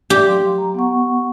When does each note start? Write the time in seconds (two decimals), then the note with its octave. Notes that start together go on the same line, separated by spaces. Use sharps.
0.10 G4 D5
0.25 F#3 F5 C6
0.58 A#5
0.74 B3 F#5 C#6